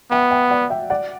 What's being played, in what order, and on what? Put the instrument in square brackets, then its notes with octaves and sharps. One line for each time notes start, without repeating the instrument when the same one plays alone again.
[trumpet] B3 [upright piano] E5 G5
[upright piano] E5 G5
D5 F#5
E5 G5
D5 F#5